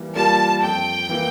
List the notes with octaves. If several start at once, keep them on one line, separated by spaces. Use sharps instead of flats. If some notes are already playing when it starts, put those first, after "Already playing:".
Already playing: E3 G3 A#3 A#4
G3 A#3 F4 A#4 A5
F2 G5
E3 A#3 E4